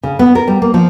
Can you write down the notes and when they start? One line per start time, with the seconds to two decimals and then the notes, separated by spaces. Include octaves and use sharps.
0.03 C#3
0.19 B3
0.35 A#4
0.48 G3
0.62 A#3
0.74 F3